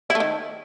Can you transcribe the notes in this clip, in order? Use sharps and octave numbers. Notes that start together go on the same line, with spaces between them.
E4
A3
D#3